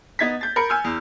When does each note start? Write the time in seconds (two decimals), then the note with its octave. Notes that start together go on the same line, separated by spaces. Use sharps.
0.19 B3 D#4 G#6 A6 B6
0.41 G6 A6
0.56 A#4 B5 C#7
0.69 G#5 E6 F6 G6
0.84 E2